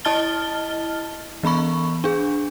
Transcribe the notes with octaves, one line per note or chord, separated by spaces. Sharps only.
E4 D#5 A5 F6 A6 G7
E3 B3 B5 C#6
D4 G#4